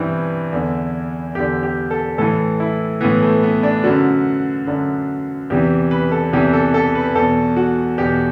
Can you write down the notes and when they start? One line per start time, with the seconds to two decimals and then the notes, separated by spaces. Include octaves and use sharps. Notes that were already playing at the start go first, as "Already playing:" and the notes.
Already playing: G2 E3 B3 C4 D4 E4
0.53 E2 D3
1.35 E2 D3 G4
1.63 G4
1.91 A4
2.18 A2 E3 A4
2.60 E4
3.01 A2 E3 B3
3.22 A3
3.43 B3
3.63 D4
3.84 F#2 D3 F#4
4.67 F#2 D3
5.50 E2 C3 E3 G4
5.91 B4
6.12 A4
6.33 E2 C3 E3 G4
6.53 A4
6.74 A4
6.95 B4
7.15 E2 B2 A4
7.56 F#4
7.98 E2 B2 G4